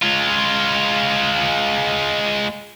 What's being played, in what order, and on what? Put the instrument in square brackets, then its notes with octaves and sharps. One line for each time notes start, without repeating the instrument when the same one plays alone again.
[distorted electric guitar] G#3 F4